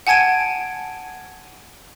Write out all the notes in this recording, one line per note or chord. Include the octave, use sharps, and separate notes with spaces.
F#5 G#5 A5 G#6 D7 D#7